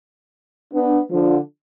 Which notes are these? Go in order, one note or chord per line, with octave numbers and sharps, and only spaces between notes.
B3 D4
D3 F3